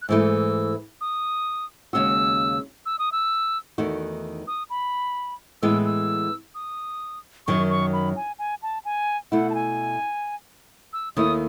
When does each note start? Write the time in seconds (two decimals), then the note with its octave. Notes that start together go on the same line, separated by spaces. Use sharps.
0.02 F#6
0.09 G#2 E3 A3 E4 E6
1.01 D#6
1.93 D#2 C#3 G#3 C#4 F#4 E6
2.86 E6
2.99 D#6
3.12 E6
3.78 E2 D#3 A3 D#4 F#4
4.47 D#6
4.70 B5
5.62 A2 E3 G#3 B3 E6
5.86 E6
6.55 D#6
7.47 F#2 D#3 F#3 C#6
7.70 C#6
7.93 B5
8.16 G#5
8.39 G#5
8.63 A5
8.85 G#5
9.32 B2 A3 E4 F#5
9.50 A5
9.55 G#5
10.93 E6
11.16 D#2 D#3 A3 E4 D#6